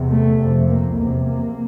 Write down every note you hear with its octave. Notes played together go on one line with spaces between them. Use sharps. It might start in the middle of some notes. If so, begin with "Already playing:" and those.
Already playing: E2 C3
A3
F2 C3
A#3
E2 C3 A#3
A#3